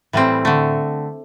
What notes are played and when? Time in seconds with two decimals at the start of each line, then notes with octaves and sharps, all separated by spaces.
0.13 A2 E3 G3 C4
0.45 D3 A3